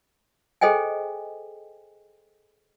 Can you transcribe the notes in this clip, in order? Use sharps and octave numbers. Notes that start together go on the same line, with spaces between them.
G#4 A4 C5 D#5 G5 G#5